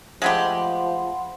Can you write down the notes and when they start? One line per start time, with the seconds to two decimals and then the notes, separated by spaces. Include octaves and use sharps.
0.22 F3 G#3 A3 G4 F#5 B5 C6